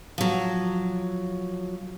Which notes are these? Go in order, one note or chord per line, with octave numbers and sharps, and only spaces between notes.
F3 F#3